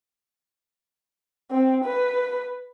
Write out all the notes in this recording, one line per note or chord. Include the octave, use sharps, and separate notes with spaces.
C4
B4